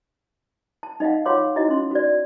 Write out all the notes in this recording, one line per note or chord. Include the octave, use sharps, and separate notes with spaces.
A5
D#4 D#5 F5 F#5
F4 C#5 F5 F#5 C6 D6
D#4 E4 F#4 D#5
C#4 C6
F#4 D5